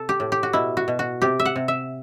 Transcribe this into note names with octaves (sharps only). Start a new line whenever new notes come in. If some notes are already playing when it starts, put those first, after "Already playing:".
Already playing: C3 A4
G4
A2
G4
F#4
B2 E4
F#4
B2
F#4
C3 G4
E5
F#5
C3
E5